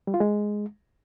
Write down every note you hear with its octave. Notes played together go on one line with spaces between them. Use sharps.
G3
F4
G#3